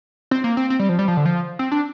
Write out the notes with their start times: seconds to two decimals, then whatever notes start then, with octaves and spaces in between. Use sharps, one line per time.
0.31 C4
0.44 A#3
0.57 C4
0.70 C4
0.79 G3
0.89 F3
0.99 G3
1.08 F3
1.17 D3
1.26 F3
1.59 C4
1.72 D4